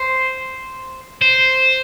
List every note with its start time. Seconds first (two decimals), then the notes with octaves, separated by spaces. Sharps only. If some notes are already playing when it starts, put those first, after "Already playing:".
Already playing: C5
1.21 C5